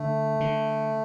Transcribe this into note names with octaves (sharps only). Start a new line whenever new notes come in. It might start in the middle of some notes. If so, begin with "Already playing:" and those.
Already playing: D3 A3
D3